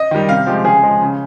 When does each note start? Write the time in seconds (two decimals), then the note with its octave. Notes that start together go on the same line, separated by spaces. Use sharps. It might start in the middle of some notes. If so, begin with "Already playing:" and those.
Already playing: D#5
0.11 D#3 G3
0.29 C3 F5
0.46 F3 G#3 G4
0.64 C#3 G#4
0.83 F3 G#3
1.01 C#3